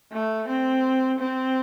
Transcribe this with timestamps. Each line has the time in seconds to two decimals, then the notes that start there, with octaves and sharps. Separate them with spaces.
0.12 A3
0.48 C4
1.19 C4